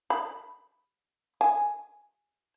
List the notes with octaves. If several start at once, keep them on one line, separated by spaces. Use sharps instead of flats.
B5
G#5